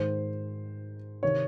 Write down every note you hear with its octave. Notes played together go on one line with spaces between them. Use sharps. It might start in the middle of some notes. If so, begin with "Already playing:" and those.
Already playing: G#2 D#3 C5
C3 D#3 C#5